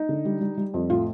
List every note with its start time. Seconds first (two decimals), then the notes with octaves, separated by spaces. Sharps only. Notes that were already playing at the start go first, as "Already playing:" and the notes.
Already playing: D#4
0.09 D3
0.25 G3
0.41 G3
0.57 G3
0.74 F2
0.90 A2 F4